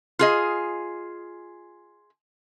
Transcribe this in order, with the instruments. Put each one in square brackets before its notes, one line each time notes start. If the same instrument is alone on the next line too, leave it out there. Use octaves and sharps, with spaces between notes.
[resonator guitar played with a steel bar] F4 G#4 D#5